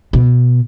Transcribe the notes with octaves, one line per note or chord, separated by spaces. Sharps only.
B2